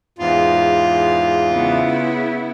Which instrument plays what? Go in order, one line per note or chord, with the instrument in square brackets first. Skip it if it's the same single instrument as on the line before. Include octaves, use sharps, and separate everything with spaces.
[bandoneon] E2 G#2 [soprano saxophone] F4
[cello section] C#3 B3 E4